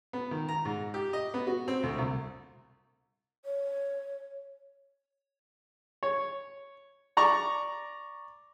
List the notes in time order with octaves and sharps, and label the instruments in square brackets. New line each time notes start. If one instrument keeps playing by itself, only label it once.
[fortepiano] B3
D#3
A#5
G#2
G4
D#5
B3
F#4
C4
D2
C2
[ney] C#5
[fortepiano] C#5
D5 A#5 C#6